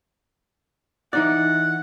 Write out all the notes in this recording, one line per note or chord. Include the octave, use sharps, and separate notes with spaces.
E3 D#4 D5 F#5